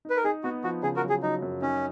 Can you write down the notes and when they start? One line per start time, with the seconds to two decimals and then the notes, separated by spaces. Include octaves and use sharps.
0.05 D#4
0.10 B4
0.17 A#4
0.24 D#4 G#4
0.44 B3 F#4
0.64 F3 F#4
0.83 C#3 G#4
0.96 F#4 A#4
1.03 F#3
1.09 G#4
1.23 F#3 D#4
1.42 F#2
1.62 C#4 D#4